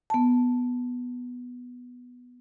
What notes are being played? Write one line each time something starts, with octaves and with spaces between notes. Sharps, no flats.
B3 A5